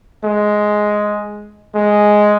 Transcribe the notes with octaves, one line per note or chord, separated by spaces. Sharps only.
G#3
G#3